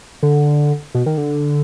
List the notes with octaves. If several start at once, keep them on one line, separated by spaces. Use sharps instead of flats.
D3
B2
D#3
D3